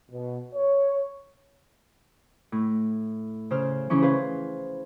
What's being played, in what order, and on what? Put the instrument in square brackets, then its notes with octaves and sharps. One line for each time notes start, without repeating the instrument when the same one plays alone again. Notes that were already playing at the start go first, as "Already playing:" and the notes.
[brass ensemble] B2
C#5
[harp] A2
C#3 C5 F6
C#3 E3 C#4 C#6
G#4 B4 C5 F5